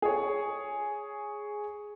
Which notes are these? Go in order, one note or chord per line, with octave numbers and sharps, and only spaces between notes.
G#4 C#5